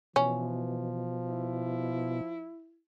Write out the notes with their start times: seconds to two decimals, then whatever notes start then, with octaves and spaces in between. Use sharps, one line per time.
0.16 B2 E3 F3 C#4
1.30 E4